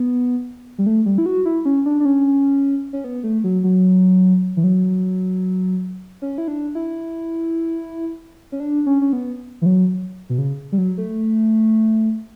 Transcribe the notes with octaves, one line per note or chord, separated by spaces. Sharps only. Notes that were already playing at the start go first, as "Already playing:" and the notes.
Already playing: B3
G3
A3
G3
E4
F#4
E4
C#4
D4
D4
C#4
C#4
B3
A3
F#3
F#3
E3
F#3
C#4
E4
D4
E4
C#4
D4
C#4
C#4
B3
E3
F#3
B2
C#3
G3
F#3
A3